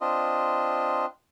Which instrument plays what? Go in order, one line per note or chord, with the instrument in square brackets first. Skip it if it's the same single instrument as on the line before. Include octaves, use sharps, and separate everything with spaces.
[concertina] C4 D4 F4 D#5